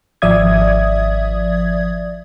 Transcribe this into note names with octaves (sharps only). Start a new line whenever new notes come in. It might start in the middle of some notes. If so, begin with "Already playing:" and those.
G#1 F3 D5 E5 D#6 G#6